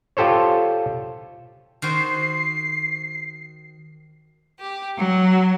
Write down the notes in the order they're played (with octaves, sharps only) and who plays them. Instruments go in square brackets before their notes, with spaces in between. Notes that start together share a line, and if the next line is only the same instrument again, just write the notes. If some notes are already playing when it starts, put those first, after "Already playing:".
[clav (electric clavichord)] F4 G4 A4 C5 C#5
[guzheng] D#3 F#4 C5 [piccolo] C7
[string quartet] G4
F#3